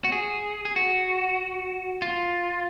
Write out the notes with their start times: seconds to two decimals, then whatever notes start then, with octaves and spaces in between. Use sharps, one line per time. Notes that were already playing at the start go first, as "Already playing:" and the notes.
0.04 F#4
0.12 G#4
0.65 G#4
0.76 F#4
2.02 F4